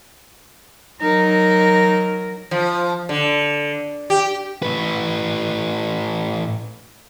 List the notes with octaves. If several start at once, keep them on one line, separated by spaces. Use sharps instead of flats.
F#3 D#4 A#4
F3
D3
G4
A2 B4